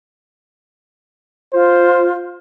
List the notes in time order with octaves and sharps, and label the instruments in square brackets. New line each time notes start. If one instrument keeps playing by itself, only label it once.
[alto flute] F4 [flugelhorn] C5